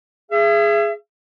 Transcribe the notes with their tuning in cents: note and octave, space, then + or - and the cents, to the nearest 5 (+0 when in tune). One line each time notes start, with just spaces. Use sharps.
G#4 +0 E5 +35